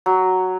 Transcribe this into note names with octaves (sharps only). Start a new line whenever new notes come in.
F#3